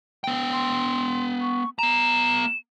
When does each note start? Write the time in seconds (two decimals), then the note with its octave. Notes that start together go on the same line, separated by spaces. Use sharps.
0.24 B3 G5
0.53 C6
1.41 C#6
1.79 B3 A#5 E7